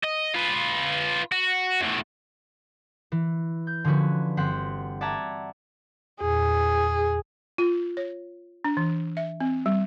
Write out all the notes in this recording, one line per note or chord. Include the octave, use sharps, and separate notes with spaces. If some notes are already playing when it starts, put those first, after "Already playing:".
D#5
F4 B4
F#4
E2 A3
E3
G6
D3 F3 C#4 F#4 B4
G1 C4 F#5 B6 C7
D5 E5 F#5 A5 A#5 G#6
E2 A#2 G#4
F4
C#5
D4
E3
E5
C4
G3